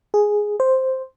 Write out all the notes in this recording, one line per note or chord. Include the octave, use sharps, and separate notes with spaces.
G#4
C5